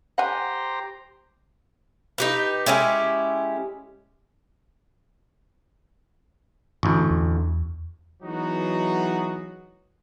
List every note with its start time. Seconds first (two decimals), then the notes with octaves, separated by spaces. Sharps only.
0.18 G4 C5 F#5 G#5 A#5
2.18 D#4 G4 B4
2.66 G#3 C#4 E4 G4
6.83 A1 D2 G2
7.11 E2
8.23 E3 F#3 G#3 B3 D#4 F#4